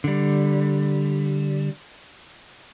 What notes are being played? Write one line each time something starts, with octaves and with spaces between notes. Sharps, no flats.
D3 G3